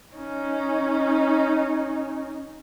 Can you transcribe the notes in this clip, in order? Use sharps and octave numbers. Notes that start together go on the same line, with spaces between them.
C#4 D#4